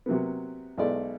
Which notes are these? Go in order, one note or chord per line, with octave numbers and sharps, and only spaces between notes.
C3 F#3 A#3 B3
B1 G#3 A3 E4 D5